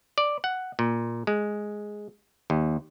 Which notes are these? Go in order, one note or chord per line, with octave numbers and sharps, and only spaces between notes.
D5
F#5
A#2
G#3
D#2